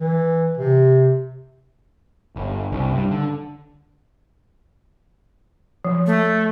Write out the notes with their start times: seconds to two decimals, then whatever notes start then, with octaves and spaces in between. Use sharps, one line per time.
0.01 E3
0.57 C3
2.36 G1
2.72 C2
2.92 G2
3.11 D3
5.85 F3
6.06 A3